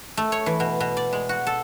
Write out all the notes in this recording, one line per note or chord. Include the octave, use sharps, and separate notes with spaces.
A3
C#5
E3
B2
B2
D5
G#3
F#4
A4